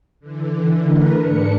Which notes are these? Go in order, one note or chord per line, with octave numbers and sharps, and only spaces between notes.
D3 E3
A3 A#4 B4
G#2 D4 C#7